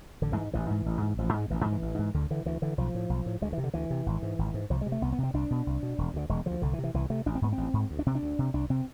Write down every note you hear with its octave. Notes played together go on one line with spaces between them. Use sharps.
A1 D3
E3
G#2
A1 E3
G#2
A1
G#2
A1 F3
G#2 G#3
A1 E3
G#2 F3
E3
A1
G#2
D2 D3
D3 E3
D2 E3
D3 E3
B1 F3
A2
B1
A2
D2 G#3
E3
C3
D3
D2 E3
C3
G#1
G#2
G#1
G#2
C2 F3
G#3
C3
A3
C2 B3
B3
C3
C4
C2 D4
B2
C2
B2
E1
D2 D3
E1 G#3
D2 D3 F3
C2 D3
E3
C3
E3
C2 E3
C3 A3
A1 D4
C4
G#2 B3
A1 C4
G#2
D2
D4
C3 C4
D4
D2
C3
C2 D4
C3 C4